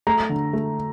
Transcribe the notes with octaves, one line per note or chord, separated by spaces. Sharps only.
A3 A#5
D3
A3